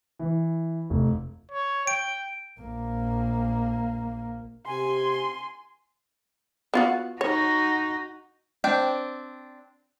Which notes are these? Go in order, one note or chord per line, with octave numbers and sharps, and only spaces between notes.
E3
F1
C#5
G5 D7
A#1 A#3
C3 G4 G#5 C6
B3 F4 F#4
D#4 F#4 C#5
C4 D4 G5